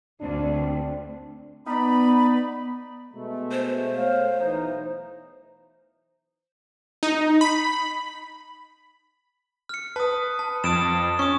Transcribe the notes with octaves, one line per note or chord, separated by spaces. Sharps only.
D2 C4 D4
B3 D#4 D5 B5
B2 G#3 A3
C5
A3 C#5 F5
B1 E3 D#4
D#4
B5
F6 C#7
B4 A5 D#6
A5
F2 D#6 D7 E7
C#4 C#6 D#6